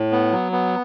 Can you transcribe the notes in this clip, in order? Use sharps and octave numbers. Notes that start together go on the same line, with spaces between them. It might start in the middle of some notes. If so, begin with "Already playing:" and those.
Already playing: A2
B3
F#3
B3